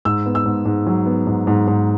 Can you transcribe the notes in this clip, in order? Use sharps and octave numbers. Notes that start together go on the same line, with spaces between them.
G#2 E6
B3
E6
G#2
G#2
F#3
B3
G#2
G#2
G#2